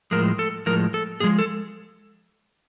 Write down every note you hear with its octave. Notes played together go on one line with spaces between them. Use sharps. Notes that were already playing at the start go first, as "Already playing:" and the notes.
A2 F3 G#3 A#4
A4
A2 F3 G#3 A#4
A4
A2 F3 G#3 G#4
A4